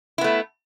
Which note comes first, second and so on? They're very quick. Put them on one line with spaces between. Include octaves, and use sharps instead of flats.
E4 B3 A3